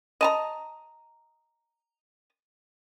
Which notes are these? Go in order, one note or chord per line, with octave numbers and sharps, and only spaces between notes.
D#5 A5 A#5